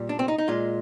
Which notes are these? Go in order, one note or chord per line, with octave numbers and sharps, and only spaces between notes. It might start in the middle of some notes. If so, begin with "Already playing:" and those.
Already playing: A#2 G3
D4
C4
D#4
D#4
A#2 G#3 F4